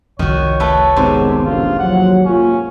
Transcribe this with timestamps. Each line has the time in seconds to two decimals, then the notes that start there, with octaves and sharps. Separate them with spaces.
0.19 F1 C2 F2 D#3 F#4 C#5
0.60 A3 A4 B4
0.96 G#2 C3 D#3 G#3 B3
1.45 A1 D3 F4
1.79 D#2 F3 F#3 F#5
2.25 A#3 C#4 F4